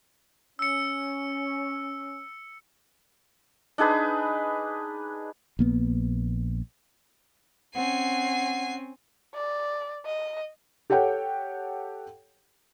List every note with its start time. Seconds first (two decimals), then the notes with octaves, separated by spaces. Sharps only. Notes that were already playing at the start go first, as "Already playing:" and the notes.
0.59 C#4 E6 C#7
3.78 D4 D#4 G#4 B4
5.59 A#1 A#3 B3
7.75 C4 C#4 F#5 G#5 C7
9.34 D5
10.06 D#5
10.90 G4 A4 C#5 F#5 G5